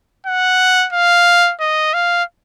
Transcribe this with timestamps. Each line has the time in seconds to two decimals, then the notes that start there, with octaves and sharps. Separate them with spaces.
0.26 F#5
0.93 F5
1.61 D#5
1.94 F5